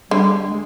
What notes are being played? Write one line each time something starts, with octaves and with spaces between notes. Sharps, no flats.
D3 G3
G#3